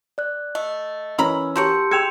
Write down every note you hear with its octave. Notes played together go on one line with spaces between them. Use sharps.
D5 F#6
A3 D#5
E3 C#4 A#4 A#5 B5 E6
F#4 G4 A#4 C#5 A5 C6 G6 C#7
G#4 G5 C6 E6 G#6 C#7 E7 F7